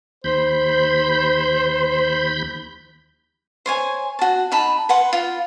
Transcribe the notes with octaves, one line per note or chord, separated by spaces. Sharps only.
D#2 C5 B5 G6
C5 C#5 G#5
F#4 A5
D#4 A5 B5
B4 F#5 C6
F4